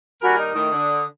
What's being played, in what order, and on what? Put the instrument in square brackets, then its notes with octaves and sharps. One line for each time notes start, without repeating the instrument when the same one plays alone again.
[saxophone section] D#2 G3 A#4 [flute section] F#4 G#5 B5
[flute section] D#4
[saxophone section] A2 D#3 [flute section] D#6
[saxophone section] D3